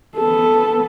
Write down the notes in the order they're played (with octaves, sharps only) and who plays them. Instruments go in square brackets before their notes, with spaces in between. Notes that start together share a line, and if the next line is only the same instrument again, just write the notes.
[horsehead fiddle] B3 A4